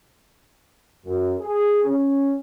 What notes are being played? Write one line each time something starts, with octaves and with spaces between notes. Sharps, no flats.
F#2
G#4
C#4